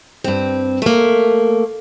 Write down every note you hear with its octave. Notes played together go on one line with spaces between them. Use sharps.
G2 C4
A3 A#3